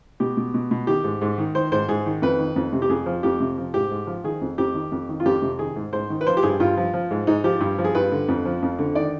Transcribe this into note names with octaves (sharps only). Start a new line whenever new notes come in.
B2 G4
B2
B2
B2
D#3 G4
G#2
G#2
D#3
D#3 C5
G#2 C5
G#2 G#4
D#3
F2 B4
D#3
F2
C3
G4
F2 G#4
F3
F2 G4
C3
F3
G#2 G4
G#2
F3
D#3 G#4
F2
F2 G4
D#3
F2
D#3
F4
F2 G4
C3
D#3 G#4
G#2
G#2 C5
D#3
B4
F3 C5
G4
G2 G#4
G2 F4
F3
F3
G#2
G#2 D#4
F3 G4
G2
F3
G#4
G2 B4
D3
F2
F3
F2
D3
D#3 D5